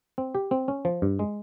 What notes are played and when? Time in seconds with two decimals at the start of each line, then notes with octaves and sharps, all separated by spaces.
0.18 C4
0.35 G4
0.51 C4
0.68 C#4
0.85 F3
1.02 G2
1.19 G#3